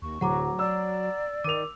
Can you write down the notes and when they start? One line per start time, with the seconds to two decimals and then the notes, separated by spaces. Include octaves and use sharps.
0.02 D#2 C#6
0.21 D1 F#3 F#5 A#5 D6
0.59 D5 E6
1.44 D#3 A#4 D6 D#7 F7